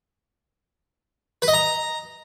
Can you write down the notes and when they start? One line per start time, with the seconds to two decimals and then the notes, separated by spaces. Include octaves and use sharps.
1.42 B4
1.48 D#5
1.54 A#5